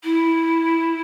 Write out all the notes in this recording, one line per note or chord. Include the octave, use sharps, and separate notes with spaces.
E4